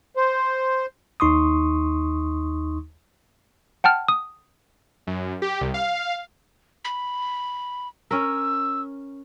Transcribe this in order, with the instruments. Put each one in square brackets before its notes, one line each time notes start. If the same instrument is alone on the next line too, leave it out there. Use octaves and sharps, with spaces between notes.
[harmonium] C5
[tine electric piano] D#2 D#4 C6 C#6 D#6
[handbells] F#5 G5 A5 F6
D#6
[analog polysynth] F#2
G4
C2
F5
[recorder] B5
[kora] C#4 A#4 [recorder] E6